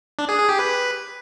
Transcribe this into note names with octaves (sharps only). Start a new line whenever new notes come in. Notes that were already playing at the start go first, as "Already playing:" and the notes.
D4
G#4
G#4
G4
B4